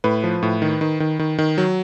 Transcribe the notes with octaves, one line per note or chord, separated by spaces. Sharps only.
A2 B4
F3
A2
D#3
D#3
D#3
D#3
D#3
F#3